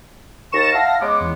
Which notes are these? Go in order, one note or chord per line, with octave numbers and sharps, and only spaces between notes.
D#2 C#6 A6 A#6 E7
E4 F5 F#5 A5 A#6
C#3 G#3 B3 D6
E2